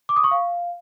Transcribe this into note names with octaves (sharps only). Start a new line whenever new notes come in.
D6
D#6
C#6
F5